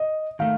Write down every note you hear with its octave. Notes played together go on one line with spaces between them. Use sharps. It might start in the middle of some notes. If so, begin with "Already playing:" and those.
Already playing: D#5
D#3 A3 F5